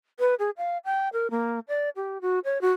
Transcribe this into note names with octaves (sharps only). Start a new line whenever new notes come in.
B4
G#4
F5
G5
A#4
A#3
D5
G4
F#4
C#5
F#4